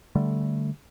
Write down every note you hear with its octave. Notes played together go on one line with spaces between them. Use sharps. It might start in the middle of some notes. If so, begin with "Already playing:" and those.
D3 G3 A3